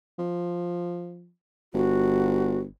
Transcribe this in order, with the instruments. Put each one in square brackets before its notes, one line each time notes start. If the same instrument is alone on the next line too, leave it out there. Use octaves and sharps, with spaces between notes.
[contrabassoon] F3
[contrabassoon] G1 [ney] F#4